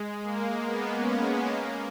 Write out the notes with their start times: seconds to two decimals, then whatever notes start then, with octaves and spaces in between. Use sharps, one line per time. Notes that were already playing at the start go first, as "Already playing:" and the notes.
Already playing: G#3
0.23 A#3
0.66 B3
0.95 C#4
1.52 A#3